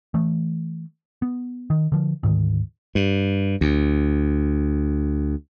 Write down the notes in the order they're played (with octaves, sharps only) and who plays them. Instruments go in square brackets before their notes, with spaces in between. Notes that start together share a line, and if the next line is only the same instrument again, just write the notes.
[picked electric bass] E3 A3
B3
D#3
D3 F3
D2 G#2 D#3
[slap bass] G2
D2